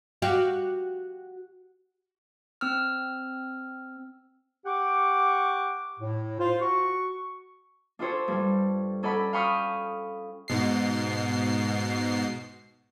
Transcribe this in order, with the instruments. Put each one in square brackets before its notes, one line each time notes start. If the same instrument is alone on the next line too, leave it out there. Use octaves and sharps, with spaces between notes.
[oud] F#4 G4 F5
[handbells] C4 E6 F6
[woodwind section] G4 F#5 C#6 D6
A2
F4 C5
F#4 C#6
[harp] D4 F4 G4 A4 C5 C#5
G2 G3
C#4 A4 D5 F#5 B5
F5 G5 B5 C#6 D#6 F6
[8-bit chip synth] G#2 B2 C7